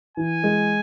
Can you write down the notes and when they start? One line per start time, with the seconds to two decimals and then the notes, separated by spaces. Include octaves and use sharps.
0.17 E3 G#5
0.44 G#3